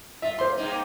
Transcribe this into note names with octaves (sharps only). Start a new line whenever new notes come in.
F4 E5
A#3 C5 C6
G2 A#3 D#4